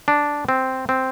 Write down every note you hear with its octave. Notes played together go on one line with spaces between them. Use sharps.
D4
C4
C4